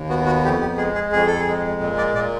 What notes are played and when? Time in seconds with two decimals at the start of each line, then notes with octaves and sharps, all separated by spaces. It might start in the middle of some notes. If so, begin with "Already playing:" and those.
Already playing: D#2
0.09 B3 F#4
0.26 F#4
0.44 F2 G4
0.61 G4
0.77 G#3 G#4
0.94 G#4
1.12 F2 G#4
1.27 A4
1.40 G#4
1.47 G#3
1.81 A#2
1.98 D5
2.15 A#2 D5